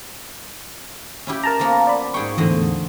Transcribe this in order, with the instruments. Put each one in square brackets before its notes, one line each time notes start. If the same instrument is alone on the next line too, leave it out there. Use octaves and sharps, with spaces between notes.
[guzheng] C#4 E4 G4
[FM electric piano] A#4 A5 A#5
[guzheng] F3 A#3 B3
[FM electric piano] D5 B5
[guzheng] G#2 G#4 G5 [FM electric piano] C#6
[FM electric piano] E2 A2 [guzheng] D3 C4 D#5